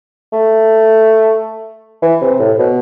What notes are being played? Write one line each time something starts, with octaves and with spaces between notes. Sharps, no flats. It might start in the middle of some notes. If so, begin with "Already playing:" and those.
A3
E3
C3
A2
B2